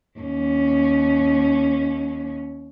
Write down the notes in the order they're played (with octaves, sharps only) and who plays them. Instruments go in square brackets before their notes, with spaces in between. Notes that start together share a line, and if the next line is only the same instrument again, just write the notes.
[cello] D#2 C#4